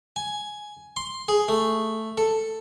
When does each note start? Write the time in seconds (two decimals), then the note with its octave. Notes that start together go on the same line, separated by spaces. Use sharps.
0.16 G#5
0.96 C6
1.28 G#4
1.48 A3
2.17 A4